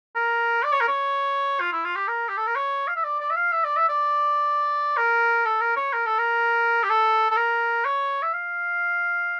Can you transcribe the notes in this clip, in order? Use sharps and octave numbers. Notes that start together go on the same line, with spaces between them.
A#4
D5
C#5
A#4
C#5
F4
E4
F4
G4
A#4
G4
A4
A#4
C#5
F5
E5
D5
D5
E5
F5
E5
D5
E5
D5
A#4
A4
A#4
C#5
A#4
A4
A#4
G4
A4
A4
A#4
C#5
E5
F5